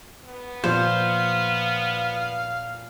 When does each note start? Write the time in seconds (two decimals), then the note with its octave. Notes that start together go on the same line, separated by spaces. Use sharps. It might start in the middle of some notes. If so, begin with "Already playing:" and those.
0.24 B3
0.64 A#2 F3 C5 F5